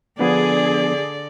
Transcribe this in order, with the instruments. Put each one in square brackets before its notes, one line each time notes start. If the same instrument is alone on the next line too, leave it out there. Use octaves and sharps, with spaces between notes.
[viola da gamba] D3 D5 [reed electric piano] F3 B3 D4 [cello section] G#4